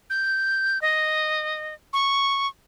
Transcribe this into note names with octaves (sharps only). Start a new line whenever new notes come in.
G6
D#5
C#6